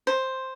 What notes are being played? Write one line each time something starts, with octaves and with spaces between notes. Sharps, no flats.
C5